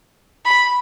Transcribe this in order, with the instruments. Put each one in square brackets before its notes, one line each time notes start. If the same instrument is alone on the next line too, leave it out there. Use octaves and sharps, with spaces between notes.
[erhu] B5